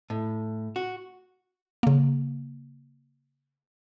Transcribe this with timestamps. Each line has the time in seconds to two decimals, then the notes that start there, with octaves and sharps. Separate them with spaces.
0.10 A2
0.76 F#4
1.83 C#3 A#3